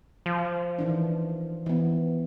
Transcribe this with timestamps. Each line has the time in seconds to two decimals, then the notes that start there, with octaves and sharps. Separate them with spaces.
0.26 F3
0.79 D#3 E3 D4
1.66 E3 B3